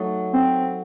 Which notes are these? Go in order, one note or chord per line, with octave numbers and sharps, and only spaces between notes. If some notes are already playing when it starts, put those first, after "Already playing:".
Already playing: F#3 A3 D#4 F#4
C4